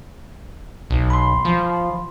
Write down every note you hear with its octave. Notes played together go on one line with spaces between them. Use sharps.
B1
B5 C6
F3